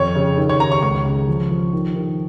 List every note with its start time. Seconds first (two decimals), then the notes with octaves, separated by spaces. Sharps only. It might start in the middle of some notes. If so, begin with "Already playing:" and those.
Already playing: F2 C#5
0.15 C#3
0.38 D#3
0.49 C#5
0.60 D#3 A#5
0.72 C#6
0.83 C#2 C#6
1.05 C#3
1.28 F3
1.51 F3
1.73 D#3
1.95 D#3